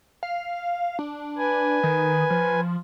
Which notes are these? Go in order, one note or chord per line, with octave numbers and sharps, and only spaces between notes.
F5
D4
B4 G#5
D#3
F3